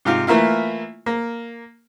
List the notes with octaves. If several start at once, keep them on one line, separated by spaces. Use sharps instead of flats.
G#2 C3 F4
E3 A3 A#3 E4 F4
A#3